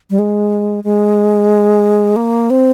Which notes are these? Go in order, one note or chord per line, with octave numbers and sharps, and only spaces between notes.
G3
G#3
G#3
A#3
C4